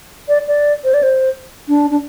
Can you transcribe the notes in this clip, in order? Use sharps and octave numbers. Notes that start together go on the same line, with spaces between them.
D5
D5
C5
D5
C5
D4
D4